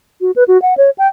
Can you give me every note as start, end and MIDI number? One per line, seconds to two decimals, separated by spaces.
0.21 0.31 66
0.36 0.44 71
0.48 0.60 66
0.62 0.74 78
0.77 0.90 73
0.98 1.08 79